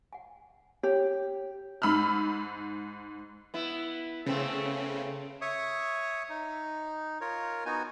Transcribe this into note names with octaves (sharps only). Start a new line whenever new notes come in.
F#5 G#5
G4 C#5
G#2 B5 E6 F6
B3 E4
C#3 A3 B3 C4
C#5 E5 C#6 D#6
D#4
F4 A#4 C#5
B3 D#4 F#4 G#5